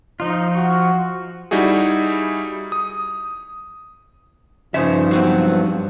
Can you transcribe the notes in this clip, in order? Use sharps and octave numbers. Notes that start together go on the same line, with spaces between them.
F3 D#4 F4
F#4
G3 D#4 E4 F#4 G#4
D#6
G2 C#3 F3 D#4 C5 E5
F#3 B3 C4